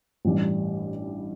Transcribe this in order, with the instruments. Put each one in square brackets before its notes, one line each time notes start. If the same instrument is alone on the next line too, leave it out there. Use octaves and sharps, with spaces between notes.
[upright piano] A1 G2 E3 G3